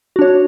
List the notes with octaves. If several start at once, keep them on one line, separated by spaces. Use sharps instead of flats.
D4 F#4 C#5